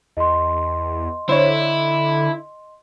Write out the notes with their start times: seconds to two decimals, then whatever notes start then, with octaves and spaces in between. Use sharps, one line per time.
0.17 E2 D#5 C6
1.29 D3 E4 C5 C#5